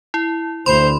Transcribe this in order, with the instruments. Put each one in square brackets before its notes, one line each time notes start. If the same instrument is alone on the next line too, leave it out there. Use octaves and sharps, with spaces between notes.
[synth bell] E4
[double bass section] D2 [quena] C5 [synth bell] B5 C6